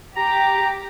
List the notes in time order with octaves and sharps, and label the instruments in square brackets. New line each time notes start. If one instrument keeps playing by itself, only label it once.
[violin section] G4 [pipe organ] A#5